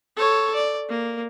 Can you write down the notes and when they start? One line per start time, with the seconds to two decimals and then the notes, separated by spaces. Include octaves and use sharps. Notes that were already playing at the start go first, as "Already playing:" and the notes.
0.16 A4 C#5
0.55 D5
0.89 A#3